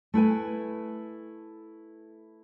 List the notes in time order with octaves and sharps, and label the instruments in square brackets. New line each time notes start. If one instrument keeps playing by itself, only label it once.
[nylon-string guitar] A3 E4 B4 G#5